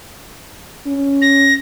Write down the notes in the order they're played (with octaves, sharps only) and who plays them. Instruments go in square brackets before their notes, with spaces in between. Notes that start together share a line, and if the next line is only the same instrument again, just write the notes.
[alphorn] C#4
[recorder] A#6